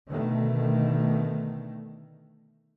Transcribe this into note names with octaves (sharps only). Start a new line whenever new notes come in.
B2 D3 D#3 A3